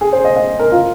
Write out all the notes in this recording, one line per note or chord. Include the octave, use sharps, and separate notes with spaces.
G#4
C5
D#5
D#5
A#4
F4